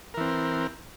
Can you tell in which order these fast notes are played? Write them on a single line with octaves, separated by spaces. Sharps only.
A#4 E3 C4